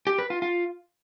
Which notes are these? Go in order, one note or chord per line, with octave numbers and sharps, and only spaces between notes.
G4
B4
F4
F4